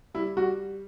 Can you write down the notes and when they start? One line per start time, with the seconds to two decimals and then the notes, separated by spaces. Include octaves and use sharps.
0.14 G3 E4
0.37 G3 F#4